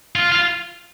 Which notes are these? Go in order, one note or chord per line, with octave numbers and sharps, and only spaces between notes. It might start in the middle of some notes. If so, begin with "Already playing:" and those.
F4
F4